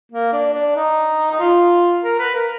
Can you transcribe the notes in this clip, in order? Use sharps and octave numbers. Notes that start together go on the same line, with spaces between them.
A#3
D4
D4
D#4
D#4
F4
A#4
B4
A#4